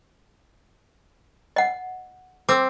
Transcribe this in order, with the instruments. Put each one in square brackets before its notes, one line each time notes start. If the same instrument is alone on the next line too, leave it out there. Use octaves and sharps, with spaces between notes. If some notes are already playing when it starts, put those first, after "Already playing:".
[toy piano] D#5 F#5
[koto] C4 [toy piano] D6 E6